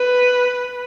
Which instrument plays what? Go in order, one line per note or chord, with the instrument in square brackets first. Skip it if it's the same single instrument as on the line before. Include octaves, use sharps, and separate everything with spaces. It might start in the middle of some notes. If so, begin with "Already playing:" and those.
Already playing: [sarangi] B4